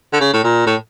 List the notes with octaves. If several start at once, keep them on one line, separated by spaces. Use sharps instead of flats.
D3
C#3
A2
A#2
A2